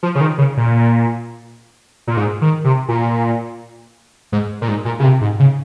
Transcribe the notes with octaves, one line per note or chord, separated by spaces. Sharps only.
F3
C#3
D#3
C#3
A#2
A#2
G#2
D#3
C3
A#2
G#2
A#2
G#2
A#2
C#3
C3
G#2
C#3